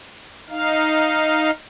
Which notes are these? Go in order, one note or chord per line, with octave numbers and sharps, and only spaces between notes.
D#4 F5